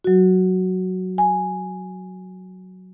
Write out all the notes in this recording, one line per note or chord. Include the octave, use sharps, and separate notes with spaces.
F#3 F#4
G#5